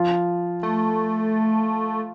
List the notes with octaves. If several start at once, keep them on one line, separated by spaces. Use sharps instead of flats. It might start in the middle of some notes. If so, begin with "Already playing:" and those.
Already playing: F3 F4
A3